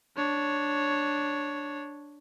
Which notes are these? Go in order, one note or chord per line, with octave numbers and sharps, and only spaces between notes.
D4 C#5